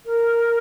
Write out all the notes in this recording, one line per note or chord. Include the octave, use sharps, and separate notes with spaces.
A#4